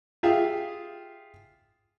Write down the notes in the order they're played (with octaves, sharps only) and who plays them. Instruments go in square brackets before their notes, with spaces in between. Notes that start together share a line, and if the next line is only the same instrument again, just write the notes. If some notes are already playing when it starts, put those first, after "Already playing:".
[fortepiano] F4 G4 G#4 E5 F5 G5